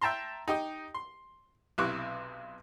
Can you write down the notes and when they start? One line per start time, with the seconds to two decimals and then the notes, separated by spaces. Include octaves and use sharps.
0.01 E5 G5 A5 A#5 C6
0.48 D#4 G4 D#5
0.94 C6
1.78 B1 C3 E4 C#6 D6 F#6